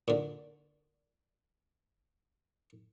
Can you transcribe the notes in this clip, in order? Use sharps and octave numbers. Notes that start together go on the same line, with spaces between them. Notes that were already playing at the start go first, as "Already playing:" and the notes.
A#2 D3